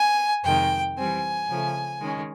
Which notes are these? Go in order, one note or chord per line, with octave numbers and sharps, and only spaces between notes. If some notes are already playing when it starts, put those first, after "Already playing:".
Already playing: G#5
F2 C3 D#3 G#3 G5
E3 G3 C4 G#5
C#3 F3 A3
D#3 G#3 C#4